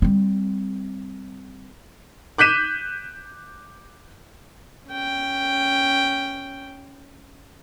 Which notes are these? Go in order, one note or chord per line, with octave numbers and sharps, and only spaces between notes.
G3 C4
D6 F#6 G6 B6 D#7 E7
C#4 G5